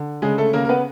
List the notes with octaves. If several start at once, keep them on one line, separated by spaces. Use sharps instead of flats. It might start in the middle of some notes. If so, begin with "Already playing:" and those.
Already playing: D3
C#3 G#3 G#4
A3 A4
C#3 A#3 A#4
A#4
B3 B4